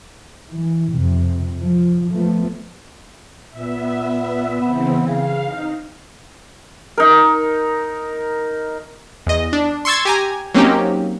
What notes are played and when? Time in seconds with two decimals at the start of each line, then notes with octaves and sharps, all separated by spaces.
0.51 E3
0.90 F2 C3
1.58 F3
2.11 F3 A3 B3
3.50 A#2 B3 E5
4.61 C#3 E3 B3 C4
5.07 C#3 F5
5.43 D#4
6.98 D#4 A#4
9.27 E2 D#5
9.53 D4
9.85 C6 C#6 E6 G#6 A6
10.05 G4 G#5 A#5
10.54 F#3 A#3 C4 C#4 D#4 G4